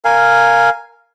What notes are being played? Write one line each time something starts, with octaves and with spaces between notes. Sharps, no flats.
A#4 F5 G#5